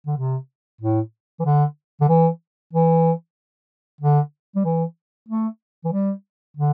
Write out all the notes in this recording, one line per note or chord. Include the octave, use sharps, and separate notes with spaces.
D3
C3
A2
E3
D3
D3
E3
E3
D3
G3
E3
A3
E3
G3
D3